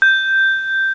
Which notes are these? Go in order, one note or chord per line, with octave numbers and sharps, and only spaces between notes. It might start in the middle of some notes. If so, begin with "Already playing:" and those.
G6